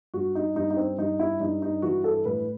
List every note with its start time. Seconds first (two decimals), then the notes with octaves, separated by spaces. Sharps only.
0.14 G2 F#4
0.35 D#4
0.55 G2 D#4
0.71 D#4
0.76 C4
0.98 G2 D#4
1.19 E4
1.40 G2 D#4
1.62 D#4
1.82 E3 F#4
2.04 A4
2.25 A2 B4